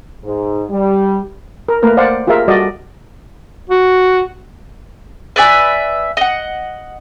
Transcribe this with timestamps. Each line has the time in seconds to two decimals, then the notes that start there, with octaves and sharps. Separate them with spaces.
0.24 G#2
0.70 G3
1.69 A#4
1.83 A3 A#3 A#4 B4
1.97 C5 D5 F5 F#5
2.27 F4 G4 G#4 A#4 E5 F5
2.48 G3 F#4 A4 D5 D#5
3.70 F#4
5.36 B4 D5 E5 G#5
6.17 D#5 F#5